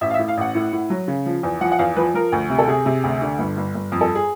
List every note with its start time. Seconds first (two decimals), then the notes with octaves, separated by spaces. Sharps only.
0.01 A1 E5
0.10 F5
0.14 E5
0.19 A2
0.28 F5
0.37 A1 F#5
0.55 A2
0.73 A2
0.90 F#3
1.08 C#3
1.26 F3
1.43 E2
1.61 F3 F#5
1.72 F#5
1.79 E2 F5
1.96 F3 B4
2.14 F3 A#4
2.32 D2
2.50 C3
2.59 A4
2.67 C3 G#4
2.86 C3
3.03 D2
3.22 D3
3.39 G1
3.57 G1
3.75 G1
3.92 F2
4.01 A4
4.15 G#4